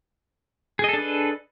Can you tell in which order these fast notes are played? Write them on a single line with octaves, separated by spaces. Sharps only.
G#4 D#5 A4 D4 B4